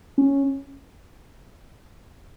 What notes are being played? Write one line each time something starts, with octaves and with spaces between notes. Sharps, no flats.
C#4